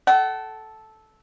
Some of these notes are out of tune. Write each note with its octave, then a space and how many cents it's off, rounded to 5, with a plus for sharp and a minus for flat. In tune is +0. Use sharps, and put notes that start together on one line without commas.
A4 -10 F#5 +35